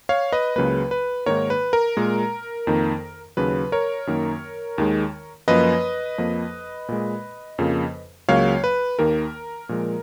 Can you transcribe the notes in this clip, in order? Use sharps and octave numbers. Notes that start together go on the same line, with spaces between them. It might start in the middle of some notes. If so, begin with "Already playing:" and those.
C#5 F5
B4 D#5
C#2 C#3 F#3 A#3 B4
B4
G#2 D#3 A#3 A#4 C#5
B4
A#4
A#2 G#3
F2 D#3 A#3
D#2 C#3 F#3 B4
A#4 C#5
F#2 D#3 A#3
D#2 D#3 G#3
F#2 F3 A#3 B4 D#5
F2 F3 A#3
A#2 G#3
F2 C#3 F3 A#3
C#2 C#3 F#3 A#3 C#5 F5
B4
D#2 D#3 A#3 A#4
A#2 F3 G#3